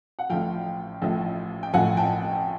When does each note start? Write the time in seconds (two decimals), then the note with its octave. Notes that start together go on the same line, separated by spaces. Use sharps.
0.19 F#5
0.30 A1 A2 F3 F5 G5
1.02 A1 A2 F3
1.63 G5
1.73 A1 A2 F3 F#5 G#5
1.97 G5 A5